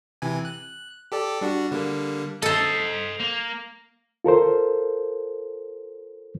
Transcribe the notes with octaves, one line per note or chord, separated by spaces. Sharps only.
C3 E3 G#5
F#6
G4 A4 D5
G3 D4 F#4
D3 G3 A#3
A4 C5 D#5 A5
A#3
F4 A4 A#4 C5